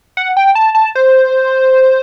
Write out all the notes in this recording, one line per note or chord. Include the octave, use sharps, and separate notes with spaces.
F#5
G5
A5
A5
C5